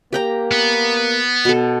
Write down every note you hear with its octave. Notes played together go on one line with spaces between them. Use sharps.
A#3 G4 G5 A#5
B3
B2 A4